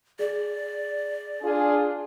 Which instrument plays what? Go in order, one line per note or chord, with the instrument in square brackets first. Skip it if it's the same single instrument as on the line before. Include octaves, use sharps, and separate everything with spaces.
[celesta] G#4 [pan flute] D5
[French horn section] D4 F4 G#4